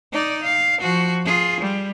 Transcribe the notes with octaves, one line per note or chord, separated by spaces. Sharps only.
D#4 D5
F5
F3 F#4
F4 G#4
G3